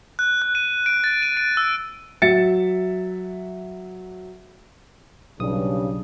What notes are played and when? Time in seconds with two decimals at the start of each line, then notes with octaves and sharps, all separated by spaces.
0.19 F#6
0.42 F#6
0.55 D#7
0.86 D7
1.04 A6
1.22 D#7
1.37 D7
1.57 E6
2.22 F#3 E5 A6 C#7
5.40 B1 G2 C#3 D#6